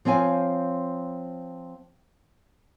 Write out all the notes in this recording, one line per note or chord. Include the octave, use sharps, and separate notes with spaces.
F3 C4 C#5 F5 G#5